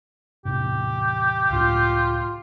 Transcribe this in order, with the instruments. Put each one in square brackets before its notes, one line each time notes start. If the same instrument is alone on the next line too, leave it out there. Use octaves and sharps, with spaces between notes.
[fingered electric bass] E2 A2 C3 [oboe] G4
[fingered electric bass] C#2 A2 [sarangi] F4